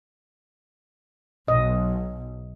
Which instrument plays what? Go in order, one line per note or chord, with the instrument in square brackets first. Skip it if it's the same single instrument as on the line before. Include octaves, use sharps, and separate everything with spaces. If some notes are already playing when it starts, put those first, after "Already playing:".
[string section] B1 [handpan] D#5